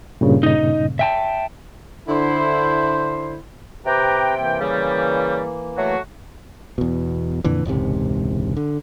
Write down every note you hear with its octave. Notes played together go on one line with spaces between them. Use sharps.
G2 A#2 C#3
D#4 D#5
E5 G5 A5
D3 E4 C5
C3 G4 B4 G5 A#5
E3 A#3
C#3 G3
F#3 A3 F#4
E2 B2
F2 A#2 D3 E3
E1 C#2 G#2 C3
D3